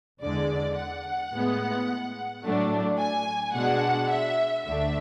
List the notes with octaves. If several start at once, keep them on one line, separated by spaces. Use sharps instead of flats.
E2 D3 G#3 D5
F#5
A2 G#3 B3
A2 F#3 A3 D4
G#5
B2 G#3 D4 F#5
E5
D2 D3 A3 D4 E5